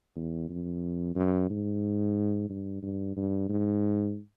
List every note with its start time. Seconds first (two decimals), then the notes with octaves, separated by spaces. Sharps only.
0.16 E2
0.49 F2
1.16 F#2
1.50 G#2
2.49 G2
2.83 G2
3.16 G2
3.49 G#2